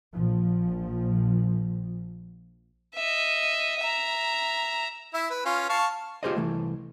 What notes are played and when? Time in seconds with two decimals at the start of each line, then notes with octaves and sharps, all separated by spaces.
0.13 A#1 F3
2.94 D#5 E5
3.79 E5 A#5
5.14 E4 E5
5.30 B4
5.45 C#4 F4
5.69 F5 A5 C#6
6.23 F4 G4 G#4 C5 D5 D#5
6.36 C2 E3 A3